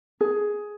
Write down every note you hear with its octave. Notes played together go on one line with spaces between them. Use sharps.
G#4